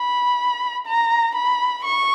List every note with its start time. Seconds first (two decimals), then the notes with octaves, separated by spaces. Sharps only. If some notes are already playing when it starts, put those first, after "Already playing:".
Already playing: B5
0.86 A#5
1.35 B5
1.83 C#6